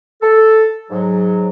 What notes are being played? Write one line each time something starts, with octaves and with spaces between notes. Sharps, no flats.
A4
G#2 F#3